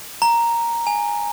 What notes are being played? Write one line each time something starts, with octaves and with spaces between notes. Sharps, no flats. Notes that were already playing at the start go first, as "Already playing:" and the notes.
A#5
G#5